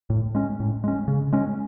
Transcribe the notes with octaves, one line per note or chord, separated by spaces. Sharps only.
A2
G#3 C#4
A2
G#3 C#4
C#3
G#3 C#4